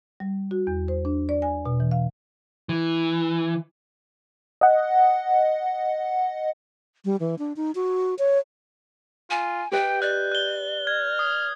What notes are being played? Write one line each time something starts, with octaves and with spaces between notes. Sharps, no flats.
G3
F#4
E2
C5
D4
D5
G#5
B2
E3
F5
E3
D#5 F#5
G3
E3
D4
D#4
F#4
C#5
F4 G#5
G4 B4 D#5 G5 G6
D5 F#6
F#6 G7
F6 G#6
D#6